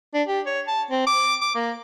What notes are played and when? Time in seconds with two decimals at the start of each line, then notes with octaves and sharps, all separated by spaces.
0.14 D4
0.28 G4
0.46 C#5
0.68 A5
0.91 C4
1.07 D6
1.41 D6
1.55 A#3